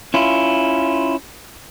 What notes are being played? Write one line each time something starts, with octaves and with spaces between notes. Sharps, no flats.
C#4 E4 F4